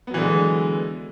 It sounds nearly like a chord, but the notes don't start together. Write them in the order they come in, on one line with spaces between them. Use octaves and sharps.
B3 F#3 E3 D3 G#3